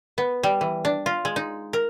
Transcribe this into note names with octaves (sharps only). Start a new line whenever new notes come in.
B3
G3
E3
D4
F4
G#3
D#4
A#4